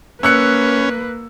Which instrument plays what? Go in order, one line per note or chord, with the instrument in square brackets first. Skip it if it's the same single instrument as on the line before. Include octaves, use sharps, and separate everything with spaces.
[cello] A#3 [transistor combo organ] C#4 [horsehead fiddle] B4 [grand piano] E6 F#6 C#7